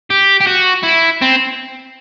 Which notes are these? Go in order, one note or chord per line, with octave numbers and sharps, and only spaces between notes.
G4
G4
F#4
E4
C4